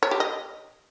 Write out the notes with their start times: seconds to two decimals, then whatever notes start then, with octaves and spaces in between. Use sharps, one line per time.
0.03 C#5
0.11 G4
0.20 D#5